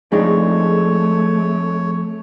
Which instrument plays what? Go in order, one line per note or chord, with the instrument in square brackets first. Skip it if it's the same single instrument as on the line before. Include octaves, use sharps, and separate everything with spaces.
[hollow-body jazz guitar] F2 D4 D#4 [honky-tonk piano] G#3 [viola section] A3 [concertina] C#5